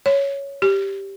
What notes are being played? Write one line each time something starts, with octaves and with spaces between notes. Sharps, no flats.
C#5
G4